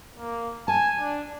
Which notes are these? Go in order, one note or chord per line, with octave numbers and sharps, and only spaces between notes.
A#3
G#5 A5
D4